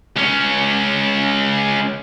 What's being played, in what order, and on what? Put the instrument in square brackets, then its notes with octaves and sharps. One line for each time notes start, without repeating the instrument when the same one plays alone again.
[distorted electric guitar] C#2 C#4